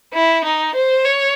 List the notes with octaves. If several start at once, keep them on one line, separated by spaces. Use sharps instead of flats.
E4
D#4
C5
C#5